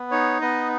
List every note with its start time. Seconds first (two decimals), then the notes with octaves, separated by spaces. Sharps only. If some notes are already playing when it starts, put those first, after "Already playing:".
Already playing: B3
0.11 D#4 C#5
0.41 B3 D#5